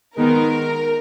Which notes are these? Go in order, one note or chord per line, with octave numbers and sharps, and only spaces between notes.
D#3 G#3 B3 D#4 A#4